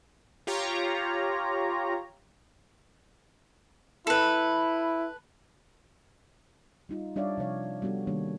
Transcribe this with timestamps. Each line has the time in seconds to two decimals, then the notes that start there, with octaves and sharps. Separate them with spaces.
0.47 F4 G4 C#5 A#5
4.07 E4 A4 B4
6.89 G3 D#4 F4
7.16 G3 D4 C#5 D5 E5 F5
7.37 C3 F3 C#5 F5
7.82 G3 B3 D4 F#4 A4
8.07 C3 D#3 G3 A#3 D4 C#5